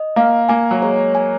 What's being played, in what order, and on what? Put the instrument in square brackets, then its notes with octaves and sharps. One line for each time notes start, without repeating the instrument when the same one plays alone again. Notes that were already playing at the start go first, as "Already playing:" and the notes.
Already playing: [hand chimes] D#5
[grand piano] A#3 [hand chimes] F5
[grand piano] A#3 [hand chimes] G#5
[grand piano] F#3
[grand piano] G#3 [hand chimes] C#5
[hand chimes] G#5